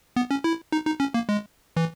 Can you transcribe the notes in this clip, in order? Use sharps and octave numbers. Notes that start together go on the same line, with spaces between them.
B3
C#4
E4
D#4
D#4
C#4
A#3
G#3
E3